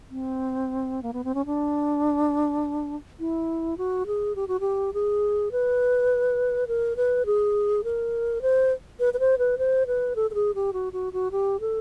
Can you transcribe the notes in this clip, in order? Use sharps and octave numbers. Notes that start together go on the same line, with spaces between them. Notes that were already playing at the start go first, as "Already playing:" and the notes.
C4
A#3
B3
C4
C#4
D4
E4
F#4
G#4
G4
F#4
G4
G#4
B4
A#4
B4
G#4
A#4
C5
B4
B4
C5
B4
C5
B4
A4
A4
G#4
G4
F#4
F#4
F#4
G4
A4